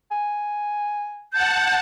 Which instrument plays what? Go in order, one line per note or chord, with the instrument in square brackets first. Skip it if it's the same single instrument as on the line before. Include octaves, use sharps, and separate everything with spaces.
[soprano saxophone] G#5
[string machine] F#5 A5 [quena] G6